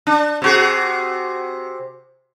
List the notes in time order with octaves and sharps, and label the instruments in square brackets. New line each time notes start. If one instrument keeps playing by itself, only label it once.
[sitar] D4
C3 F#4 G#4